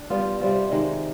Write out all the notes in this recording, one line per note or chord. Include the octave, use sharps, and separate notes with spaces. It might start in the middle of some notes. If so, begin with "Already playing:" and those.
Already playing: D4
G3 B3 F4
C3 G3 C4 F4
C3 D#3 G#3